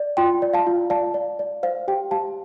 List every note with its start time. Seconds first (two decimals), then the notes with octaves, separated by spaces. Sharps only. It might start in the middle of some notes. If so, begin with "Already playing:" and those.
Already playing: D5
0.17 F4 G5 C6
0.42 D5
0.53 F5 A5
0.67 F4
0.90 D5 F5 A5
1.14 D5
1.39 D5
1.63 C5 F5
1.88 G4 G5
2.11 G4 F5 A5